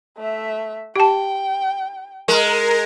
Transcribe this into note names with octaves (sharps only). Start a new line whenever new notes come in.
A3 E5
G4 G5 A5
G#3 A#4